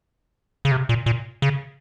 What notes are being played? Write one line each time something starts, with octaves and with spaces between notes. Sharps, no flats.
C#3
C3
A#2
A#2
C#3